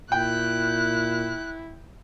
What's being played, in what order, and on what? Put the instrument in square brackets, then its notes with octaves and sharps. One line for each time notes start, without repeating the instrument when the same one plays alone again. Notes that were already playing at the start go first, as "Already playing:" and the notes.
[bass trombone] A#2 [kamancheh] E4 [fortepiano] G5 [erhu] F#6